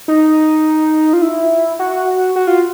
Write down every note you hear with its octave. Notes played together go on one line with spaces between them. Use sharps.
D#4
F4
E4
F#4
F#4
F4